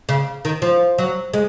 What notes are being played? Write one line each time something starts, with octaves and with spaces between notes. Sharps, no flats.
C#3
D#3
F3
F#3
G#3